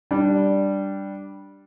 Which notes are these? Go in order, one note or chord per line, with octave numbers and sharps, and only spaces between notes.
G3 D4